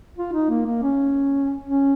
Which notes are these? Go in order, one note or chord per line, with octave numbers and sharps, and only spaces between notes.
F4
D#4
A#3
A#3
C#4
C#4